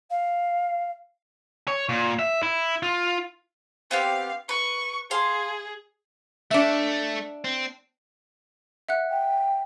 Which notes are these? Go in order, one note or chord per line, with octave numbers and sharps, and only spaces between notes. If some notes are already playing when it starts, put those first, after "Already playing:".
F5
C#5
A#2
E5
E4
F4
B3 C4 G4 F5
B4 C#6
G#4 F5 A5 C6
A3 D4 E5
C4
E5 F#5 F#6
G5